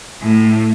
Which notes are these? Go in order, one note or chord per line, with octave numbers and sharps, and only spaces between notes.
A2